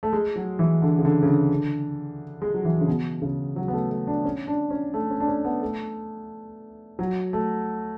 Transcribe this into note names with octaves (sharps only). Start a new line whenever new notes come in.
A3
G#3
F#3
E3
D3
C#3
D3
C#3
D3
G#3
F#3
E3
C#3
B2
C#3
F#3
B3
A3
A3
D4
C#4
D4
C#4
A3
C#4
D4
C#4
B3
A3
F#3
A3